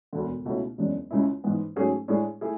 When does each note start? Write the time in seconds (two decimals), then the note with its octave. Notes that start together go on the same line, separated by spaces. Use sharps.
0.13 E1 D2 D3
0.45 C#2 B2 A3 C#4 E4
0.78 F#1 E2 C#3 G#3 D4
1.11 C#2 C#3 G#3 C#4 E4
1.44 A1 G#2 E3 G#3 B3
1.76 G#2 F#3 A3 C#4 G#4
2.08 A2 G#3 D4 G#4
2.41 A3 E4 G#4